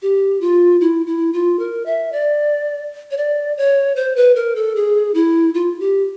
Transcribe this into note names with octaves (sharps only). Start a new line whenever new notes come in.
G4
F4
E4
E4
F4
A#4
E5
D5
C#5
D5
C#5
C5
B4
A#4
A4
G#4
E4
F4
G4